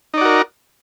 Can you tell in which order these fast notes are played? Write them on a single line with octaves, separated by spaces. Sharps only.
D#4 D5 F#4 A#4